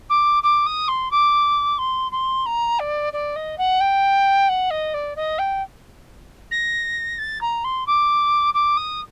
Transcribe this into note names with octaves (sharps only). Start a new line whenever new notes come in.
D6
D6
D#6
C6
D6
C6
C6
A#5
D5
D5
D#5
F#5
G5
F#5
D#5
D5
D#5
G5
A#6
A6
A#5
C6
D6
D6
D#6